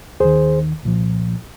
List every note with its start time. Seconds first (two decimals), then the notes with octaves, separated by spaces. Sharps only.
0.20 D#2 D#3 G#4 C5
0.83 C2 A#2 F3